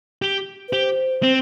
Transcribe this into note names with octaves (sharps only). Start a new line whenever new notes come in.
G4
B4
G4 C5
C4